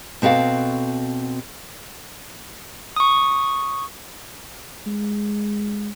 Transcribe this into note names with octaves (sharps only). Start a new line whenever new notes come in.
B2 C4 F#4 A4 F5
C#6 D#6
G#3